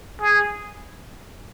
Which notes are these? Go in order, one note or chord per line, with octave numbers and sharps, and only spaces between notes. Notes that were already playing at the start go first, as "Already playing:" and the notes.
G#4